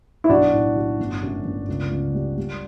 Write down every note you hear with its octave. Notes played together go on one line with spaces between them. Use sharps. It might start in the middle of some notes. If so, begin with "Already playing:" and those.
E4
B1 D4 F#4
A2
F#3
G1
F#2
G1
C#2
C#2
G3
G3